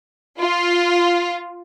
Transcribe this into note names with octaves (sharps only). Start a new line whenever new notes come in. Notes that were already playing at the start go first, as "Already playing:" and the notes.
F4